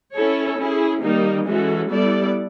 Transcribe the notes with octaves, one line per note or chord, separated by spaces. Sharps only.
C#4 E4 A4 C#5
C#4 E4 G#4
D#3 G3 A#3 D#4
E3 G#3 C#4 F#4 A4
G3 B3 E4 A4 D5